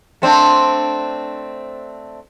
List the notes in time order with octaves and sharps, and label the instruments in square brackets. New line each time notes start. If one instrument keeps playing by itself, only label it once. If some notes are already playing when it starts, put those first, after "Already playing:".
[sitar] A3 C4 D4